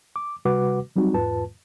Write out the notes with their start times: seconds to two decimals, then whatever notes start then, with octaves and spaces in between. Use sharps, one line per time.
0.16 D6
0.45 C3 G3 F#4 B4 F#5 D6
0.96 F#3 G3 C4 D#4 F#4
1.14 E2 G#2 F4 B4 A5